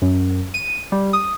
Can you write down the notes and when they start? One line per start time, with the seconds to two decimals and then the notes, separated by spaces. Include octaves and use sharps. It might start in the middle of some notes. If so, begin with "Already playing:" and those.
0.02 F#2
0.54 D#7
0.92 G3
1.13 D#6